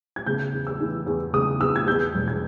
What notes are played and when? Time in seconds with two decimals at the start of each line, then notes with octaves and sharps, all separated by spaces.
0.16 G#6
0.26 C#3 G6
0.53 E2
0.67 E6
0.81 E3
1.06 E2
1.33 C#3 D#6
1.60 E2 E6
1.76 G#6
1.87 E2 G6
2.14 E1
2.28 G#6